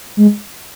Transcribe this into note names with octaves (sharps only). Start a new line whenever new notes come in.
G#3